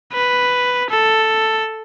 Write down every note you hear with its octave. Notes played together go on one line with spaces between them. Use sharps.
B4
A4